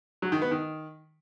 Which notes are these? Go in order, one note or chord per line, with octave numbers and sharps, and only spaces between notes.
F#3
D#3
B3
D#3